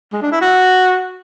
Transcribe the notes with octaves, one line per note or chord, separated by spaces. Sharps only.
G#3
D4
E4
F#4